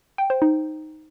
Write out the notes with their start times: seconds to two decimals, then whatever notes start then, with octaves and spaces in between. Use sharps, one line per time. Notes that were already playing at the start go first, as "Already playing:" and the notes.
0.18 G5
0.30 C5
0.42 D#4